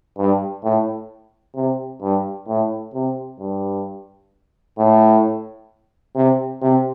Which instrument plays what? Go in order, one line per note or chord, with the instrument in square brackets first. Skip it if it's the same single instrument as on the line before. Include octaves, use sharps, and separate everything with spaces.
[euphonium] G2
A2
C3
G2
A2
C3
G2
A2
C3
C3